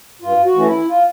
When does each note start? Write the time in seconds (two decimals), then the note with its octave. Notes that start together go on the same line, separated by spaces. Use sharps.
0.22 G2 F4
0.44 F#4
0.55 E3 A3 C#4
0.66 E4
0.88 F4